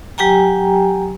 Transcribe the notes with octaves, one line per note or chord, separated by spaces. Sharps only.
F#3 G4 G5 G#5 A#5